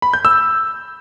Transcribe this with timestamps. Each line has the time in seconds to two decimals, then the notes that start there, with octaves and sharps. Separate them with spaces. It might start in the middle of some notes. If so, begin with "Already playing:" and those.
0.02 B5
0.13 G6
0.25 E6